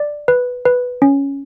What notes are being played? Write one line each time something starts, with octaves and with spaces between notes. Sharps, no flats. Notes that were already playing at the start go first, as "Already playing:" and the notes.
Already playing: D5
B4
B4
C#4